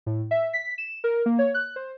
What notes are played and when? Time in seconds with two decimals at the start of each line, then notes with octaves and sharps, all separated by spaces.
0.06 A2
0.31 E5
0.53 B6
0.78 E7
1.04 A#4
1.26 A#3
1.39 C#5
1.54 F#6
1.76 C5